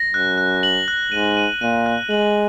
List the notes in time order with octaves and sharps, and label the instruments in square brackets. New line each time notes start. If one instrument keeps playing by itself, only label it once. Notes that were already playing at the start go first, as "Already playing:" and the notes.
Already playing: [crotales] A#6
[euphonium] F#2 [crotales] F#6
[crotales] F#6
F#7
F#6
[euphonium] G#2 [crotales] D#7
[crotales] D#7
[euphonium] A#2 [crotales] D#7
[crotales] F#6
[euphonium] G#3 [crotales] F#7